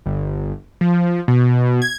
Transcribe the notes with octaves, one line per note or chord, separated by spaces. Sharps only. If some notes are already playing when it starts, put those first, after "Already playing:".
G1
F3
B2
G#6